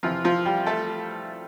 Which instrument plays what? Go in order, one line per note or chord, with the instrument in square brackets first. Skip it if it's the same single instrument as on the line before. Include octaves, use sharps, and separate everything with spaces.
[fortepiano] F2 C3 E3 F3 F4
F3 F4
G3 G4
A3 A4